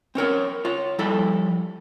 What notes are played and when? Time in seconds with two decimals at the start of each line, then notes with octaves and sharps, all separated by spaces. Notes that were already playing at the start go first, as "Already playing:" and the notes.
0.15 C4 C#4 A#4 C#5
0.65 F4 C#5
0.99 F3 G3 E4 A4